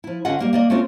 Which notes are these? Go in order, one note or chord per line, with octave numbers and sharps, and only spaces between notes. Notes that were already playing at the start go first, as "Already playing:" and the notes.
F3 E4
D3 C#4 F4 D#5 F#5
G3 A#3 F5
A#3 D5 D#5
A3 A#3 C4 C#4 F4